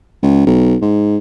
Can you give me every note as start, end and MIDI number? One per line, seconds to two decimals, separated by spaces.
0.23 0.42 37
0.46 0.76 35
0.82 1.18 44